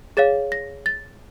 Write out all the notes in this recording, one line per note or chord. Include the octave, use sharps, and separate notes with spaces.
G#4 C#5 F5 A6
A#6
A6